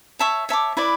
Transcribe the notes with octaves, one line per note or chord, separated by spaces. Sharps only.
C#5 E5 A5 C#6
C#5 E5 A5 D6
E4 B4 D5